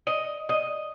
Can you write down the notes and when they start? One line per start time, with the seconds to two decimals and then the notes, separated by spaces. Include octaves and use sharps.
0.07 D#5
0.49 D#5